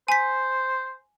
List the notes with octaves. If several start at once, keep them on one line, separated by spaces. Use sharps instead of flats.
C5 G#5 B6